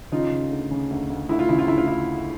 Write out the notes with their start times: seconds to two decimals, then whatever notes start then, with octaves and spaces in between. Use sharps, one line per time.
0.12 C#3 D#4 F4
0.31 C#3
0.51 D2
0.71 C#3
0.90 D2
1.10 D2
1.29 D2 E4
1.39 F4
1.49 C#3 E4
1.59 F4
1.68 D2 E4
1.78 F4
1.87 E4